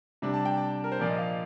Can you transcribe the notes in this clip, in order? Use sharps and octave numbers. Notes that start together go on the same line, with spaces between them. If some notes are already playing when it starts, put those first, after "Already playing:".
C3 G3 D4
A5
G5
A5
A#4
C5
A#2 F3 A#3 D5
D#5
F5